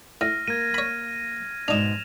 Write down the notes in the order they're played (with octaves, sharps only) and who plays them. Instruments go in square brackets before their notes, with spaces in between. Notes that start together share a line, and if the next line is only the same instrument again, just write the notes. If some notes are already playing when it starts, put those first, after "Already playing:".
[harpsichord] A2 [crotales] F6 A#6 D#7
[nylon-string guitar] A#3 [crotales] G#6 D#7
[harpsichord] C#5 B5
[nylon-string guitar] G#2 B2 [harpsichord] D4 D#4 [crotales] E7 F7